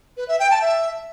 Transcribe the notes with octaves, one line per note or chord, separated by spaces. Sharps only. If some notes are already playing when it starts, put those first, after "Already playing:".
B4
E5
G5
A5
E5